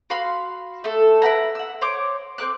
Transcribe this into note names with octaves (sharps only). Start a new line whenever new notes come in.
F#4 F5 B5 C6
A3 A4
E4 B4 F#5 A#5
F#5 E6
C5 C#5 D6
C4 A#4 D6 F#6